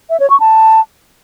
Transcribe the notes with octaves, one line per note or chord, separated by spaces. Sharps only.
E5
C#5
C#6
A5